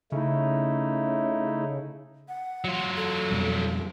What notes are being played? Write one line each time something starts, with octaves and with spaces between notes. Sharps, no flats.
C#3 A3 D#4 E4
F#5
F#3 F4
A4
F2 B2 G3